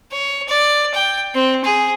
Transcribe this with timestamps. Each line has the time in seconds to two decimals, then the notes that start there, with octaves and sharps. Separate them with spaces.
0.11 C#5
0.48 D5
0.94 G5
1.35 C4
1.65 G#4